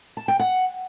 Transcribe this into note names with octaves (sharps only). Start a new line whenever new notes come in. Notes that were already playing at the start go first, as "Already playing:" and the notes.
A5
G5
F#5